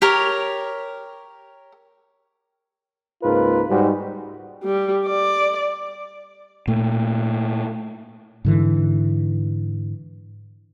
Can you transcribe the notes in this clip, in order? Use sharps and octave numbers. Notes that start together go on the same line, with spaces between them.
G4 A#4 C#5
C#2 G#2 A#3 F4 A#4 B4
G#2 G3 D#4 F#4
G3
D5
A#2 A3
G#2 D3 E3